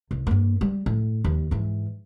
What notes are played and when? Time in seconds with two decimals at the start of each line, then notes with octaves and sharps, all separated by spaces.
0.11 C2
0.27 G2 A#3
0.61 G3
0.86 A2
1.24 D#2
1.51 G#2 E3